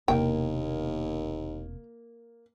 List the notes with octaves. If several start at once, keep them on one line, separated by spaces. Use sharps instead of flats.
E1 D#2 C3 A#3 G5